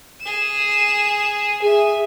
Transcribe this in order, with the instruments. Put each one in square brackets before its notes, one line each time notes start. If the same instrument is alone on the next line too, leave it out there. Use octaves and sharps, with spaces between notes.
[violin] G#4 E7
[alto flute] G#4 [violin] E5 G#5